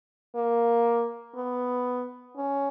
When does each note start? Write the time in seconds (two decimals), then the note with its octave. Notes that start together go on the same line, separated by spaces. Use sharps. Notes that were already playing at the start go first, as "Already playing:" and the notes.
0.36 A#3
1.35 B3
2.36 C#4